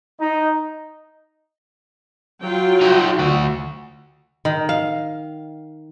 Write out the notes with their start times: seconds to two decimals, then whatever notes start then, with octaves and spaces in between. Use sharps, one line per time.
0.21 D#4
2.43 F#3 F4 G5
2.81 D#4 F#4
3.19 D2 F#4
4.45 D#3
4.69 F5